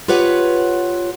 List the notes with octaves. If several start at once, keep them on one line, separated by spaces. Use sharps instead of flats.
F4 G4 B4 C#5 F#5